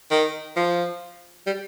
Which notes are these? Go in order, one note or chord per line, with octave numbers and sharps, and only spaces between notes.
D#3
F3
G3